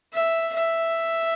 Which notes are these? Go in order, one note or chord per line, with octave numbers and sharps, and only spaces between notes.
E5
E5